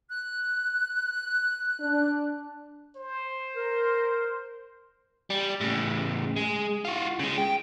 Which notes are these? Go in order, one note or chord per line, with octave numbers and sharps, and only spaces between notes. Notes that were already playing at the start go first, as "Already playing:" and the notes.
F#6
D4
C5
A#4
G3
A2 C#3
G#3
F4 F#4
C#3 G#3
G5